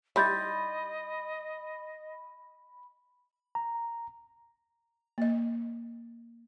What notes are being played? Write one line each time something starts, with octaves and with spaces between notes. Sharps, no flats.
G3 D#4 E4 D#5 B5 C6 G6 A6
A#5
A#3 D#5